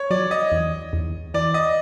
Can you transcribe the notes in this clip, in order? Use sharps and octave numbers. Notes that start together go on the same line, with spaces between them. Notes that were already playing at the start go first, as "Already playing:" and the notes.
Already playing: C#5
F#3 D5
D#5
E2
E2
E3 D5
D#5